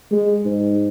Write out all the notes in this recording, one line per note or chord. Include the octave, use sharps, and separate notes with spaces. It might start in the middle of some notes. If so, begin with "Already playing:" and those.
G#3
G#2